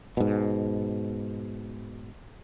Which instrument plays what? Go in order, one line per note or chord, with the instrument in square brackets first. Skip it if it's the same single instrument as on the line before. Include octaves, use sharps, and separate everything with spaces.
[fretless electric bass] G#2 B2